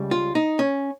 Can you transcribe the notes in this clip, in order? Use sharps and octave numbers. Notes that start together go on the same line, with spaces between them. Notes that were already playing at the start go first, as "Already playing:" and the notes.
Already playing: C#2 C#3 G3
F4
D#4
C#4